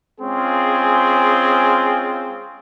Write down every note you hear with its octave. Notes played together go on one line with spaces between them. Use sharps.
G#3 C4 C#4 F4 G#4